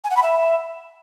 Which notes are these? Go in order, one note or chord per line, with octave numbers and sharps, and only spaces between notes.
G#5
F#5
B5
E5